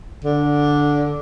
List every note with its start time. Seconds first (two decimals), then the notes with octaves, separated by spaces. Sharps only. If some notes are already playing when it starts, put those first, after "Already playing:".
0.24 D3